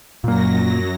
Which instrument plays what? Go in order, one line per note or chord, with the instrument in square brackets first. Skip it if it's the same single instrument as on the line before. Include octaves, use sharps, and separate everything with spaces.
[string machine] F#2 F#3 A#6 [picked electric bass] A#2 A#3